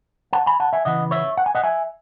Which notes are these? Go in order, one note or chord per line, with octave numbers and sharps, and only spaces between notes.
F#5 A5
G#5 B5
F#5 A5
E5 G#5
C#3 E3 B3 D#5 F#5
C#5 E5
F#5
G#5
D#5 F#5
E5 G#5